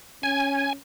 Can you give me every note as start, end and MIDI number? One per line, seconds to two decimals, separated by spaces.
0.23 0.75 61
0.23 0.73 80